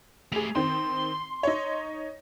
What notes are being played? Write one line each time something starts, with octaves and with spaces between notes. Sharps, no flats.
A3 G4 G#4 F7
D#3 C4 C6
D#4 C#5